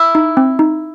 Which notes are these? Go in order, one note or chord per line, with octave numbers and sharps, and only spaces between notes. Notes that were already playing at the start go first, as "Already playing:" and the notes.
Already playing: E4
D#4
C4
D#4